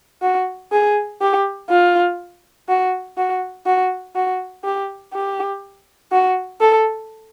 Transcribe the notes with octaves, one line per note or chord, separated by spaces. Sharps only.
F#4
G#4
G4
F4
F#4
F#4
F#4
F#4
G4
G4
F#4
A4